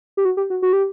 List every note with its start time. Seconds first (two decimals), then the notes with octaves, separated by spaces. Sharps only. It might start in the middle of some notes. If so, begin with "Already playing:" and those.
0.17 G4
0.25 F#4
0.37 G4
0.50 F#4
0.62 F#4
0.73 G4